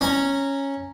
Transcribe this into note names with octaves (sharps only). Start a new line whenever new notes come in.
C#4 G#5 A#5